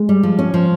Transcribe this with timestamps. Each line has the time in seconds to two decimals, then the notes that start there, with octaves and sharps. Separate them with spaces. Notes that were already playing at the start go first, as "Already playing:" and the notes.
Already playing: G#3
0.09 G3
0.23 F3
0.39 C#4
0.54 F3